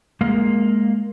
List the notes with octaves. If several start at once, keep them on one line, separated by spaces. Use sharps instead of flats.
G#3 A#3 F5